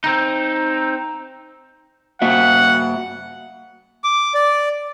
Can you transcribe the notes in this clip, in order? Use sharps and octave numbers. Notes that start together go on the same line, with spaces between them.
C4 D#4
A#3 F#4 E5 F#5
D6
D5